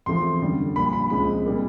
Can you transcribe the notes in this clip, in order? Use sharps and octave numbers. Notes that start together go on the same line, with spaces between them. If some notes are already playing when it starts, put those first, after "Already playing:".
E2 C3 F3 A3 C6
F#2 D3 G3
A#1 A#2 G3 B5
B5
C#2 C3 F3 G#3 B5
A#2 G3 A#3